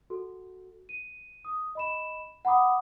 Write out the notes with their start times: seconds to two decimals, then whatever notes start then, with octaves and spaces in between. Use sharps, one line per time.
0.10 F#4 A4
0.89 D#7
1.45 D#6
1.75 D#5 B5 E7
2.45 F#5 A#5 B5 D6 D#6